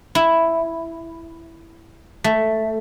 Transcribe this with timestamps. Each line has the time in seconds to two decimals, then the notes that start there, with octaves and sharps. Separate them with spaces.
0.15 E4
2.24 A3